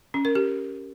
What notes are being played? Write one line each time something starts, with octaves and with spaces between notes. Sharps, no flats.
C#4
A#4
G4